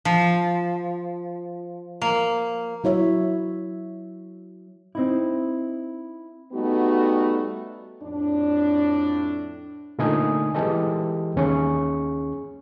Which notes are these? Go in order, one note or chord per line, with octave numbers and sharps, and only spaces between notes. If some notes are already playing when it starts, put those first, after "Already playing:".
F3
A#3
F#3 E4 C#5 E5
C4 D#4 E4
G3 A3 B3 D#4 F#4
F2 A2 D4
A#2 D3 A3 D#4 G#5 D#6
E3 G#3 G4 A4 D#5
D#2 C#4 G#4 C#6